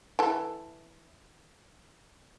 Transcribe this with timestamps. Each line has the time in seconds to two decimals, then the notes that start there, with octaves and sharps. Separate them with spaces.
0.19 E3 A4